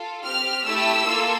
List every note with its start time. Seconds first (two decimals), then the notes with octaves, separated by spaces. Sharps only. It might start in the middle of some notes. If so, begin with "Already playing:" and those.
Already playing: F4 A4
0.25 C4 G4 F6
0.65 A3 E4 G4 E6
1.07 A#3 F4 A4